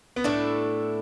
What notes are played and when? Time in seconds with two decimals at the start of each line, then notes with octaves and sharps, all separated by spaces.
0.16 B3
0.24 A2 A3 D4 E4 A4